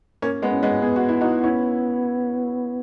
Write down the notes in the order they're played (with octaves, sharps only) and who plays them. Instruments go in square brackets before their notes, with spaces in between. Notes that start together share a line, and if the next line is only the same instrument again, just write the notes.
[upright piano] A#3 C#4
G#3 B3
[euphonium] C#4
[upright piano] G#3 B3
[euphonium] B3 [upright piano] G#4
[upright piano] F#4
E4
D#4 F#4
C#4 E4